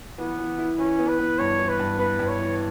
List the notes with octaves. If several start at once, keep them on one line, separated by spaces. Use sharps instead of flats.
E3 B3
E3
E4
E3 C#4
B3
B4
B3
G2 C#5
E3
B4
G2
B3 B4
G2
C#5
E3